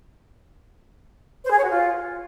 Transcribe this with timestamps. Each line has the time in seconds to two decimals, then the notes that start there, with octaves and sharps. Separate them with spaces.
1.44 C5
1.51 G#4
1.57 C#5
1.63 F#4
1.70 F4